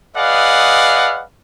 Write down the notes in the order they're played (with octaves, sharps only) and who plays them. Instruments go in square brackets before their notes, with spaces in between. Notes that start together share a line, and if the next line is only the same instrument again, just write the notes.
[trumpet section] G#4 B4 D5 D#5 F5 F#5